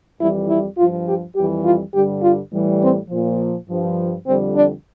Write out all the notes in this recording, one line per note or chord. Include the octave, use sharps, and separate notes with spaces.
F2 E3 G3 E4
E4
G2 F3 F4
G4
F2 E3 G3 G4
F4
G2 D3 G3 G4
F4
A2 E3 G3
C4
A#2 F3
G2 F3
F2 D3 G3 C4
D4